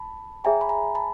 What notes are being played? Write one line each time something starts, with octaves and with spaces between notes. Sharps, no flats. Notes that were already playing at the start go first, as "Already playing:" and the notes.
Already playing: A5 B5
G#4 C#5 E5 G5 G#5 A#5 C6
B5
G#5 A#5
A5 B5